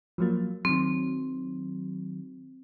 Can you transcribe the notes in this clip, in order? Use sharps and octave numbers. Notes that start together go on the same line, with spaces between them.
F3 F#3 A#3
D#3 F#3 C4